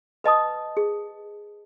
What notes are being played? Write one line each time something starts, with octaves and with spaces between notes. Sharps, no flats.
B4 D#5 A5 D#6
G#4